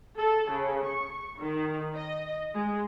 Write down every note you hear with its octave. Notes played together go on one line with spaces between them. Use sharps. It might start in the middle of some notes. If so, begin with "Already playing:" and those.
A4
C#3
C#6
D#3
D#5
G#3